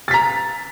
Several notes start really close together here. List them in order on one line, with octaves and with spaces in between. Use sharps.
A6 B6 A#5